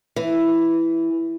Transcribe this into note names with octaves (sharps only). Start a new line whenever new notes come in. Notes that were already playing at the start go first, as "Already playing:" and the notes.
E3